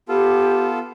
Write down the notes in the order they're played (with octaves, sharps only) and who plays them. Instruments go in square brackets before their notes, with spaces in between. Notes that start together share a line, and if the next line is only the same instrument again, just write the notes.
[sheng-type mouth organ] B3 F4 A4 [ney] G4